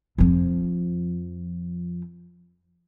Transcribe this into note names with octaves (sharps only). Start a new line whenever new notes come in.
F2 F3